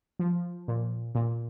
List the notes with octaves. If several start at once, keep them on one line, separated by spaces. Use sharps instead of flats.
F3
A#2
A#2